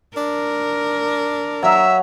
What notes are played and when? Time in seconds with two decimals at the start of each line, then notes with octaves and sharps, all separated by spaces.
0.17 D4 A#4
1.63 F#3 E5 F5